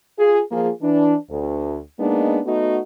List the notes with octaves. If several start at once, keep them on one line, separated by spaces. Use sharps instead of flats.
F4 G#4
F3 A#3 F4 G#4
E3 D4
D2
G#3 A#3 B3 D4 D#4
A3 B3 D#4 F#4